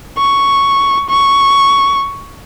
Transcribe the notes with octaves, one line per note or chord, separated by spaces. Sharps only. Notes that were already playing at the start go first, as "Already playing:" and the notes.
C#6
C#6